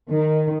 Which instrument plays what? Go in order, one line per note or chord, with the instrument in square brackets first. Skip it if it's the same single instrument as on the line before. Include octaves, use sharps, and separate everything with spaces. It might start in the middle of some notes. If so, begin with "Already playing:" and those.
[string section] D#3